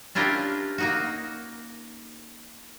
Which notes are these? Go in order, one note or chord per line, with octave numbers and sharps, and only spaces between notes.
C#4 D4 E4 F4 G4 A#4
A#3 D#4 F#4